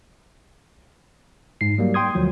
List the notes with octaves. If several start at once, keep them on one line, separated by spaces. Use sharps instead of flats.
G#2 C7
F#3 G3 A#3
G5 C6 D#6 G#6
D2 F3 F#3